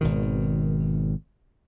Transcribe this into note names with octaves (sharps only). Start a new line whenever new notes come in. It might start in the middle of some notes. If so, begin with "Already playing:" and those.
G#1 B2 D#3